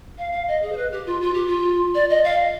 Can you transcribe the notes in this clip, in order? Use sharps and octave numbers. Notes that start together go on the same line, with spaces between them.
F5
F5
D#5
G#4
C5
B4
G4
F4
F4
G4
F4
D5
D#5
F5